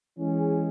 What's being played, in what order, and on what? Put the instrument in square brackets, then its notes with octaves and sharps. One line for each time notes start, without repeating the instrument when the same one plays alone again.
[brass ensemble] E3 G#3 C#4 G#4